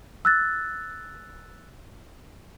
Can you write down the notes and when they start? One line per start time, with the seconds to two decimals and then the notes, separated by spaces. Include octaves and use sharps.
0.25 E6 F#6 A6